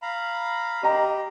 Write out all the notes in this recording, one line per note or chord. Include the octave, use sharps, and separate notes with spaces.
F5 A#5 B5
G4 D#5 A#5